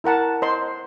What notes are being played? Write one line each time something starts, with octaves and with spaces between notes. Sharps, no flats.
E4 A#4 F#5 A5
C5 D#5 C6